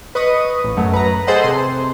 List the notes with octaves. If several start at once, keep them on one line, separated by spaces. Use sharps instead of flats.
B4 D#5 C#6 D#6
A1
F#2 F#3 A3
B4 A#5
G#4 A4 C5 D#5 F#5
C3 C6